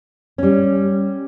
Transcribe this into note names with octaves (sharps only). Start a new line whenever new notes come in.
G3 C#4